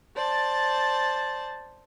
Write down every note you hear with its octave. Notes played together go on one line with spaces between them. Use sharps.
C5 D5 A5